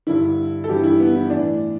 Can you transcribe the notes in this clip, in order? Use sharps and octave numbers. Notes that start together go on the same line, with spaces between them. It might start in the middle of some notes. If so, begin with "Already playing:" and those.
G2 D3 E4
A4
G2 E3 G4
E4
B3
E4
A2 E3 D4